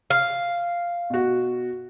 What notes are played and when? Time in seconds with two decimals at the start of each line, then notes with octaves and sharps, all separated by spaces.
0.10 F5
1.10 B2 F#4